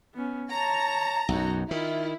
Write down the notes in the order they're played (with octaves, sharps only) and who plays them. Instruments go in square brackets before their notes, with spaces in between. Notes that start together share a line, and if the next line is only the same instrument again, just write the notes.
[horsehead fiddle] B3 C#4
[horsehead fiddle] C#5 A5 [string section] A#5
[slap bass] B1 F#2 [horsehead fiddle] D#4 F#4
[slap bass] D#3 [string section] E4 [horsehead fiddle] F4